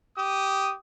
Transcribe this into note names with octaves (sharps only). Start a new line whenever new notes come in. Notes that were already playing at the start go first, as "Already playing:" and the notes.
G4 D#6